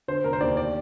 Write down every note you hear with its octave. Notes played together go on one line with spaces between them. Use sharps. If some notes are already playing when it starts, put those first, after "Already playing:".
D3 C5
F1 A#4
C5
D#2 D5
D5